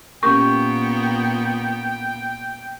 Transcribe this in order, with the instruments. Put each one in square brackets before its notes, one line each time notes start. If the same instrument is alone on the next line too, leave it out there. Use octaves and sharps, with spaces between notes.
[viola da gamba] A#2 A#3 B3 [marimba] C#4 G4 A#4 [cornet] G5 [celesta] C#6